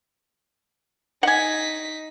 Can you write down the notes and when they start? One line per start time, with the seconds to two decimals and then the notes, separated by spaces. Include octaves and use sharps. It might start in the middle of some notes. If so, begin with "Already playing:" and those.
1.23 D#4 F#5 G#5 B6